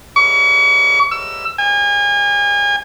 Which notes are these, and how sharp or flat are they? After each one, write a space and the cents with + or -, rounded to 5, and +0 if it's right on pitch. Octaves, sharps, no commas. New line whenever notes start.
C#6 +40
E6 +20
G#5 -35